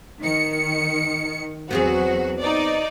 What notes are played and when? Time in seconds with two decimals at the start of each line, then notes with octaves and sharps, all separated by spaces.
0.20 D#3 C#7
1.71 E2 F#3 B3 C4 F#4 G#4
2.40 D#4 D5